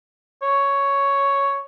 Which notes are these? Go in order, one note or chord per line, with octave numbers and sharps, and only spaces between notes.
C#5